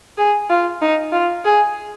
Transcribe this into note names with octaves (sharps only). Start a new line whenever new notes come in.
G#4
F4
D#4
F4
G#4